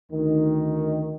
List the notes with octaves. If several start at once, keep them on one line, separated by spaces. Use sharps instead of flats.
D2 D#3